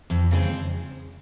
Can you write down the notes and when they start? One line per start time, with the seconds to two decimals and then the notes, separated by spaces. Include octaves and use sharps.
0.10 F2
0.31 C#3 G#3 C4